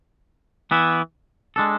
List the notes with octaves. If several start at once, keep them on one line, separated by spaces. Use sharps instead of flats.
E3 B3 E4
G#3 D4 A4